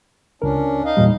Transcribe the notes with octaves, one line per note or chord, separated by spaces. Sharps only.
C#2 C#4 D4 A#4
D#4 D#5 F5
E2 A#2 G3